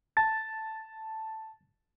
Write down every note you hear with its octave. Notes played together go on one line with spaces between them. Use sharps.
A5 A6